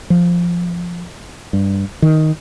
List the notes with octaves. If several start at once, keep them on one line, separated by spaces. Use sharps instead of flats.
F3
G2
D#3